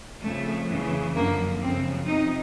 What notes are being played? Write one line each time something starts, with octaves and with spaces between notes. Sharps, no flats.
F2 C#3 F3 A3
F2 C#3 E3
F#2 D3 F3 A#3
F#2 C#3 F3 C4
F2 C3 F3 D#4